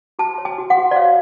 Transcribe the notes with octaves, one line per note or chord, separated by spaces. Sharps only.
F#4 A5
C#5
G#5
F#4
F#5
F#4
D5
C#5 F5